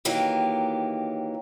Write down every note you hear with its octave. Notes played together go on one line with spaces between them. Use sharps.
D#3 E3 F#3 A#3 G4